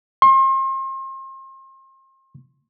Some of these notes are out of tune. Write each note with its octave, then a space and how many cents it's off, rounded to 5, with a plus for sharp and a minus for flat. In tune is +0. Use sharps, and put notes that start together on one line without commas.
C6 +35